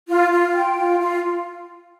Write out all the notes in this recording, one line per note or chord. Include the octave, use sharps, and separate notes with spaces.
F4
F4
G5
F4
F4